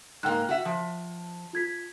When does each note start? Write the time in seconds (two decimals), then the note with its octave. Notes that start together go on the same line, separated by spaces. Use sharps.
0.23 G#2 A#3 G5 F#6
0.49 F#4 E5
0.65 F3
1.53 F4 G#6 B6